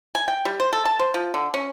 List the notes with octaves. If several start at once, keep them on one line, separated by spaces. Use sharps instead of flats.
G#5
G5
G3
C5
A4
A5
C5
F3
D3
C#4